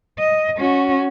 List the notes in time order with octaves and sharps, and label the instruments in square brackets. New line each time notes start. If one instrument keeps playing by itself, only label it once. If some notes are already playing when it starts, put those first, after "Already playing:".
[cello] D#5
C#4 F#4